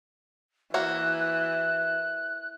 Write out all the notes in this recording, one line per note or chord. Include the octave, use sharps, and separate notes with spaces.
E3 A#3 F#4 E5 F#6